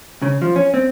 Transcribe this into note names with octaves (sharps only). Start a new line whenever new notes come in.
C#3
F3
C#4
C4